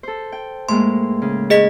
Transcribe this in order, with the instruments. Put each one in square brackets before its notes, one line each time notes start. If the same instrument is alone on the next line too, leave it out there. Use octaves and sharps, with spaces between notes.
[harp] A4 C5
G5
[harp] A2 G#3 A#3 [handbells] C6
[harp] C#3
[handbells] G#4 D#5 B6